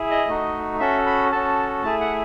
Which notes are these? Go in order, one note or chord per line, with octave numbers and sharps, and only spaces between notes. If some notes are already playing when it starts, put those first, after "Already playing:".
Already playing: E4 G#4
D#5
A3 D#4 F#4
C#4 F#4 A4 E5
B5
C#4 F#4 A4 A5
A3 E4 G#4 A5
F#5